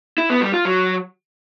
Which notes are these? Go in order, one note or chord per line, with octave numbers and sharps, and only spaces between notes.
E4
B3
G3
F4
F#3